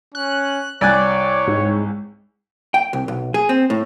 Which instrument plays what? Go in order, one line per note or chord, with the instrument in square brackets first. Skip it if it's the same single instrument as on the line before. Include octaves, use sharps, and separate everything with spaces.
[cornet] C#4 [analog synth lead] F#6
[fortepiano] C2 G#5 F#6 [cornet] C#5 [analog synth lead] D5
[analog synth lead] G#2
[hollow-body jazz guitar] G5
C2
B1
G#4
C4
A2